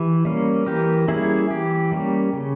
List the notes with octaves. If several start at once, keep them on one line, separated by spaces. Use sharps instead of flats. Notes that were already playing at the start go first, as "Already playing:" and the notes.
Already playing: E3 G4
G3 A#3 C#4
E3 G4 A#4
G3 A#3 C#4 E4 G#4
E3 G4
G3 A#3 C#4
C#3